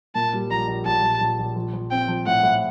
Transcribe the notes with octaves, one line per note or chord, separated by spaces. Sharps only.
A#2 A5
G3
A#1 A#5
A#1
A#1 A5
A#1
A#1
A#1
F3
F3
C4 G5
F3
A2 F#5
A2